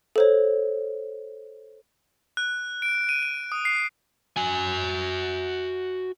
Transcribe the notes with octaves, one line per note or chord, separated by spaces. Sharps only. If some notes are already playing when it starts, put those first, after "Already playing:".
A4 C5 C#5
F#6
D7
D#7
D#7
D#6
C7
F#4 G#5